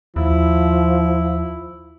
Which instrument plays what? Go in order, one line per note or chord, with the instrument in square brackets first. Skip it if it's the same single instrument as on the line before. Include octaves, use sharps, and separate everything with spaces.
[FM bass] D#2 [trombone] F3 [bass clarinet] E4